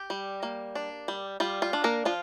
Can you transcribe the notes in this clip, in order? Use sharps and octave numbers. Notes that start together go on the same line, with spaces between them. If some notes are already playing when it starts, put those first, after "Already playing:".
Already playing: G4
G3
A#3
D4
G3
G3 F4
F4
D4
A#3 A#4
F3 F4